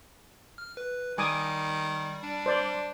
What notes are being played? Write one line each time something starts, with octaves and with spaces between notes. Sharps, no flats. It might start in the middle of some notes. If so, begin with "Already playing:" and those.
F6
B4
D#3 G3 G#5 D6 D#6
D4
C5 D5